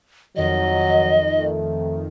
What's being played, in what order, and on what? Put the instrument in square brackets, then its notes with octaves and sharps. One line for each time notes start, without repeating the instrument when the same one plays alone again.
[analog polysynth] F2 D#3 [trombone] F#3 [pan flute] D#5
[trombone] A3